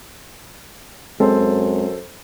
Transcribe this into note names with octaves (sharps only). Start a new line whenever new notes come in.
F#2 G#3 C4 A4 C5